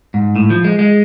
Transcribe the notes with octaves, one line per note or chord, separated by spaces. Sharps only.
G#2
A2
F3
G#3
G#3